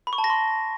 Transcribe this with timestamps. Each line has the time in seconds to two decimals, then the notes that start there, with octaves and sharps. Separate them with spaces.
0.07 B5
0.13 C#6
0.18 A5
0.24 A#6
0.30 C6